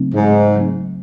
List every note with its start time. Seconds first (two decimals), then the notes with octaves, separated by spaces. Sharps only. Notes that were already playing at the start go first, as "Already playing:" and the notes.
Already playing: C#3 F#3 A3 C4 D#4
0.14 G#2
0.54 C#3 F#3 A3 C4 D#4